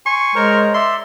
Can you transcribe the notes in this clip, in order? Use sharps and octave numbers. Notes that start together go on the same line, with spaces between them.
G#5 C6 C#6
G#3 A#4 C5 C#5 A#5
D5 E5 C6